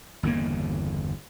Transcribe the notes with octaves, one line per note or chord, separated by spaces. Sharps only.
G1 E2 C#3 A#3